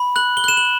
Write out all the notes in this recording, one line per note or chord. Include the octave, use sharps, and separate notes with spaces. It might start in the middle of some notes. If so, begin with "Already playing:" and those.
Already playing: B5
F#6 F#7
G7
F#6 E7
F#7